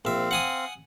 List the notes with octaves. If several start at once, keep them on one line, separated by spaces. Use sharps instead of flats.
A#1 C4 E5 F5
F#5 G#5 D#6